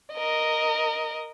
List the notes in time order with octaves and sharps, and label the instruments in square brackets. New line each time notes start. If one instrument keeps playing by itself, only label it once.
[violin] A#4 D#5